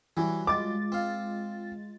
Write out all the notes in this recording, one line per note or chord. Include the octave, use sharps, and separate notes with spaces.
E3 F#3 G3
G#3 F4 D6 A6
C4 F5